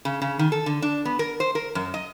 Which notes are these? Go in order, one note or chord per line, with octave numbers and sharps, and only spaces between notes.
C#3
C#3
D#3
A4
D3
D4
B3
A#4
C5
A#4
F#2
D#5